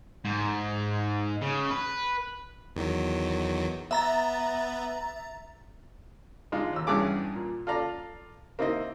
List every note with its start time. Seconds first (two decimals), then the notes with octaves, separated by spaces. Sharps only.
0.25 G#2
1.42 C#3
1.71 B4
2.76 E2 D#3 F#3
3.91 B3 E5 A#5 A6
6.52 G#3 D4 D#4 F4
6.73 D#2 E6
6.87 E2 G2 C#4 G#4 D6
7.35 A#2
7.67 F4 A4 D5 A#5
8.59 A#3 C4 D#4 E4 D#5